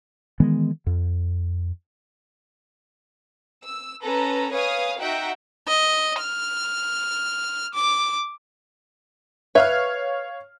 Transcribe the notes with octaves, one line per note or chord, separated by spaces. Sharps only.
D#3 E3 G#3 B3
F2
E6
C#4 A4 B4 A#5
B4 C#5 F5 G#5 D#6
D#4 F#4 E5 F#5 G5
D#5
F6
D6
B4 C#5 E5 F5 F6